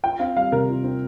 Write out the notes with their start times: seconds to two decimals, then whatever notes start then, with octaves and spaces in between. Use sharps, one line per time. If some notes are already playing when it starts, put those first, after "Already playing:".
0.03 F4 G5
0.19 C4 F5
0.36 G3 F5
0.52 C3 A#4
0.69 F4
0.84 C4